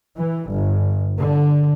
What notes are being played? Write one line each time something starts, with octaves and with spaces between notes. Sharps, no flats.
E3
G1
D3